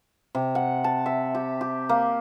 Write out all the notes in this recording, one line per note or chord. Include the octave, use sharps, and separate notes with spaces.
C3
F#5
A5
E5
G4
G4
A#3